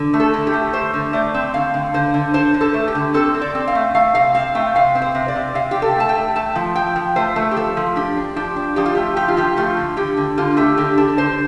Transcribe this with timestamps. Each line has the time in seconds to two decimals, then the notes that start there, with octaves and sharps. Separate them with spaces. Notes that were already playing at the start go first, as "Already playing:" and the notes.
Already playing: D3
0.14 A3
0.20 A4
0.34 D3
0.47 G4
0.53 A3
0.73 A3 C5
0.94 D3
1.13 A3 D5
1.34 C4
1.54 D3 F5
1.74 D3
1.94 D3 C5
2.14 D3
2.34 D3 C5
2.54 D3
2.61 A4
2.74 A3
2.88 G4
2.95 D3
3.14 C4 A4
3.34 C4
3.41 D5
3.55 C4
3.67 F5
3.75 A3
3.95 A3 F5
4.15 C3 F5
4.35 C4 F5
4.55 A3 G5
4.75 C3 F5
4.95 C4
5.02 C5
5.15 C3
5.28 D5
5.36 C3
5.55 C3 F5
5.71 C3 G4
5.82 A4
5.96 A3 A5
6.09 G5
6.15 A3
6.36 A3 A5
6.56 F3
6.76 F3 G5
6.96 F3
7.16 A3 C5
7.36 A3
7.51 G4
7.56 F3 A4
7.77 F3
7.96 D4 G4
8.16 D4
8.36 F3 G4
8.56 D4
8.76 F3 G4
8.86 F4
8.95 A3 G4
9.16 F3 G4
9.28 F4
9.37 F3 G4
9.57 A3 F4
9.77 D3
9.97 D3 G4
10.17 D3
10.37 D3 F4
10.57 A3 G4
10.77 D3 G4
10.97 D4 A4
11.17 D3 C5